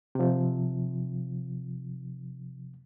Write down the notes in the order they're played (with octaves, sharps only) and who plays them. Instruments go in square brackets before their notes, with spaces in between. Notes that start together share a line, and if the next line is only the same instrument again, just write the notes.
[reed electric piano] C3 F3